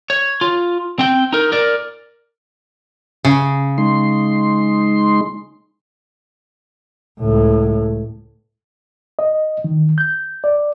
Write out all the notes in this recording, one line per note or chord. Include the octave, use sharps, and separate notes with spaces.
C#5
F4
C4 G5
D#4 A#4
A#4 D5
C#3
G#3 D#4 C6
C#2 A2
D#5
D#3
G6
D5